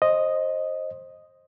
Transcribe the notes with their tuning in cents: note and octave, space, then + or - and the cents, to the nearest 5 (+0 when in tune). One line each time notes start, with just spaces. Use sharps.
C5 +20 D#5 +0